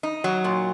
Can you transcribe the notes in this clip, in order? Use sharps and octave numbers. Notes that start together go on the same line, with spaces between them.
D#4
F#3
A#2